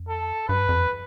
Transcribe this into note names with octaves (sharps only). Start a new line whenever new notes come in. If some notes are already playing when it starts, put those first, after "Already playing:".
Already playing: F2
A4
G2 B4
F2